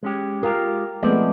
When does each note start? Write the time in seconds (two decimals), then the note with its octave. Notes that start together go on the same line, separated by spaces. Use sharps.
0.03 G#3 C#4 G4
0.43 G#3 F4 G4 A#4
1.03 F3 G#3 A3 B3 C4 D5